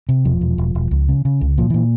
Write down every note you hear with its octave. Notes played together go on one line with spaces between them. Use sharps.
C3
E1 F3
E1
E1
E1
C#2
C#3
C#3
C#2
A#2 F3
A#2 E3